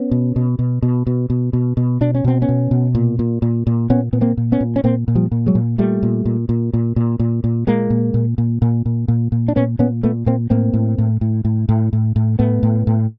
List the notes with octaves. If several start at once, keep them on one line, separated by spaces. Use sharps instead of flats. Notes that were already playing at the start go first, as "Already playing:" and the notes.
Already playing: B3 C#4
B2
B2
B2
B2
B2
B2
B2
B2
B2 D4
C#4
B2 C4
B3 C#4
B2
B2
A#2
A#2
A#2
A#2
A#2 B3 C#4
A#2 B3
A#3 C4
A#2
B3 C#4
A#2
C#4
A#2 A#3 C4
A#2
F3 G3
A#2
F#3 G#3
A#2
A#2 G3 A3
A#2
A#2
A#2
A#2
A#2
A#2
A#2
A#2 G#3 A#3
A#2
A#2
A#2
A#2
A#2
A#2
A#2
D4
A#2 B3 C#4
A#2 B3 C#4
A#2 A3 B3
A#2 A#3 C4
A2 A#3 C4
A2
A2
A2
A2
A2
A2
A2
A2 A3 B3
A2
A2